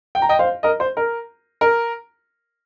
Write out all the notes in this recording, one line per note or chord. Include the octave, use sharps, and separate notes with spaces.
G5
A#5
D#5 G5
C5 F5
A#4 D#5
C5
A#4
A#4